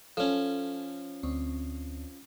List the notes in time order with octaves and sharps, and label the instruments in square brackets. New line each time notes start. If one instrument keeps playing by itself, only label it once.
[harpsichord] F3 C#4 [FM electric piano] A4
[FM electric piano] D2 C4